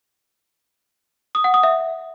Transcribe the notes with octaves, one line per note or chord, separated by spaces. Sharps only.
D#6
F#5
D#6
E5